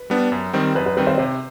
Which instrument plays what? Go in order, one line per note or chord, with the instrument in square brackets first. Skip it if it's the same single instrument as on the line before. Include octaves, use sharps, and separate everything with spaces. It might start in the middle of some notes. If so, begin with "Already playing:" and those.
Already playing: [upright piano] B4
[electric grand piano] G3 B3 D4
F#2
D#3 G3 C4
[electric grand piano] F#2 [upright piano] B4
[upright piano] B4
[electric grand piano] D#3 G3 C4 [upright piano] B4
[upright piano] C5
[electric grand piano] C3 [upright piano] C5